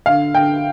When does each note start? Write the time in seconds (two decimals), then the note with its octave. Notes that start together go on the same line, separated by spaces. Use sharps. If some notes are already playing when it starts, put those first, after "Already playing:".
0.06 D3 F5
0.35 D3 G5